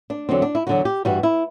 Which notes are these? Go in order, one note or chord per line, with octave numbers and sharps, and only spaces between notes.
D4
E2 D3 F#3 C4
D4
E4
E2 D3 F#3 F#4
G4
G2 E3 G3 F#4
E4